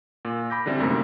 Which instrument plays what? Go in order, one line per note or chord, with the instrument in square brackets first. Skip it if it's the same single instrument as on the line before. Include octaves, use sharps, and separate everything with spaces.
[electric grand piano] A#2
B5 D6 G6 A#6
D3 E3 G3 C4 E4
F#2 C3 A3 A#3 D#4